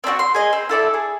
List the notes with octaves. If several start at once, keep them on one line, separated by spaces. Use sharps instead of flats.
C4 D4 E4 F#4
C6
G#4 D#5
C4
E4 A4 D5 E5
G#4